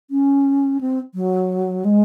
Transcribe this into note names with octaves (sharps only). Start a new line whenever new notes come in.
C#4
C4
F#3
G#3